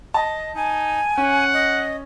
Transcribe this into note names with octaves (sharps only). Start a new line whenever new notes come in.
D#5 A5
D#4 G#5
C#4 F#5
D#5